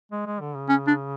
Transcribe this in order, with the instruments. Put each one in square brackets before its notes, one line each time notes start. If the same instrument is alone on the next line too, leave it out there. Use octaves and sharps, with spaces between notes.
[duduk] G#3
G#3
D3
C#3
[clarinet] C#4
D4